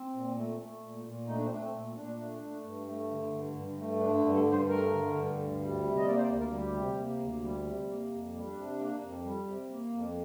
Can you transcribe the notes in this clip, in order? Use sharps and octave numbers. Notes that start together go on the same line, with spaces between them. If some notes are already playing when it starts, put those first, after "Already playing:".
Already playing: C4
A#2
A3
A3
A#2
A#2
A3 D#4
D4
C4
A3 D4
C4
A#2
A#2 D4
A3
A3
G2
A3
D3
G2
G2
A3
D3 D4
D4
G2
A4
G2
C5
A3 A#4
D3
G2
D2
G3
C3
D#5
A#3 D5
C5
D5
D2
A#4
G3
G4
C3
A#3
D2
G3
C3
A#3
F2
G3
D4
C3
A#3
F2
G3
C3
A#3
F2